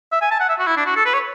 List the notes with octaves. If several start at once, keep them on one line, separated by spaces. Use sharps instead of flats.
E5
G#5
A5
F#5
E5
F#4
E4
D4
F#4
A4
B4
C#5